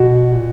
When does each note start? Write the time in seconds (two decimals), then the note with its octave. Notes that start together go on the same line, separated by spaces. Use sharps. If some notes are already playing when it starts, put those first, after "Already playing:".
Already playing: B2 F#4
0.33 A#2